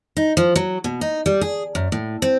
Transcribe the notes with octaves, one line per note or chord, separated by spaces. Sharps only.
D#4
F3
F#3
B2
D#4
G3
G#4
F#2
A2
C4